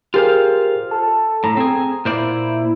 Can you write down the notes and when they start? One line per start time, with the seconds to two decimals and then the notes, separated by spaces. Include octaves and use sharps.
0.14 F4 G4 G#4 A#4 C5 F5
0.91 A4 A5
1.44 A2 A#5 A#6
1.57 C4 G#4
2.05 A#2 E4 C5 D5